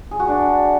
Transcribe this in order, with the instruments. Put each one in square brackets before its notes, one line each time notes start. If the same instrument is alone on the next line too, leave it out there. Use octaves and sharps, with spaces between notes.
[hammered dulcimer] G#4
F#4
D4